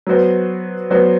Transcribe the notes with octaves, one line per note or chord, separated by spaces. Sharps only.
F#3 B3 F#4 C5
F#3 B3 F#4 C5